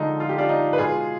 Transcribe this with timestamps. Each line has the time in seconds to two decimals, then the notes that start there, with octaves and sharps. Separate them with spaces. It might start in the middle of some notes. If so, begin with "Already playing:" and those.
Already playing: D3 F3 G#3 D#4
0.20 F4
0.29 G4
0.38 D4 F4
0.49 D#4
0.73 B4
0.78 B2 G#3 F4 G#4